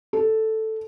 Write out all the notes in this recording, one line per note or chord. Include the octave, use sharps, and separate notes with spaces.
A4